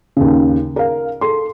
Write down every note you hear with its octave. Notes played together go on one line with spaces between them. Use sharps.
D#2 C#3
A#4 F5
A4 C6